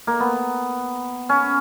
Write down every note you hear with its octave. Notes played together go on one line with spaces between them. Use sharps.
A#3
B3
C#4